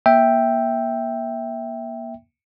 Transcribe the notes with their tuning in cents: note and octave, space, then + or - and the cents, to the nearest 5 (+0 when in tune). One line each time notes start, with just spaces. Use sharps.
A#3 +25 E5 +0 G5 +0